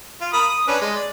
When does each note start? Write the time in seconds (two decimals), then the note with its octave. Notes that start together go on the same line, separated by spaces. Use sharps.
0.21 F4
0.33 A#4 B5 D#6
0.49 D#6
0.68 C#4 D4 B4
0.81 G#3
0.96 D5